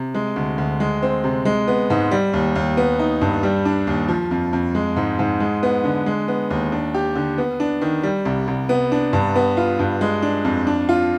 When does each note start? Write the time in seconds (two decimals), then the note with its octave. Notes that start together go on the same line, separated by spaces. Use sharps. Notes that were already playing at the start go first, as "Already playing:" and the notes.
Already playing: C3
0.15 G#3
0.36 D2
0.58 D2
0.80 G#3
1.02 C4
1.24 C3
1.45 G#3
1.68 B3
1.90 G#2
2.11 G3
2.33 D#2
2.55 D#2
2.77 B3
2.99 D#4
3.21 G2
3.43 G3
3.65 D4
3.87 D#2
4.08 F3
4.31 F2
4.53 F2
4.75 G#3
4.96 G#2
5.19 G#2
5.40 G#3
5.63 B3
5.84 D3
6.06 G#3
6.28 B3
6.50 D#2
6.72 D4
6.94 G4
7.15 D3
7.38 B3
7.60 D4
7.81 D#3
8.03 G3
8.25 C2
8.48 C2
8.69 B3
8.92 D4
9.13 G2
9.36 B3
9.57 F4
9.79 G2
10.01 G#3
10.22 D4
10.45 F2
10.67 D4
10.89 F4